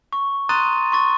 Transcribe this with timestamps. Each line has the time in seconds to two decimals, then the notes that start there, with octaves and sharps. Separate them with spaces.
0.13 C#6
0.49 A#5 C6 D#6 F#6 A6 D#7
0.92 C6 C#6 A6